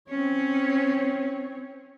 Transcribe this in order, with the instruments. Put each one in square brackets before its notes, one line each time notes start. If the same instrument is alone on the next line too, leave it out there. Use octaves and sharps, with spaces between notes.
[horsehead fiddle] C4 C#5 [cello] C#4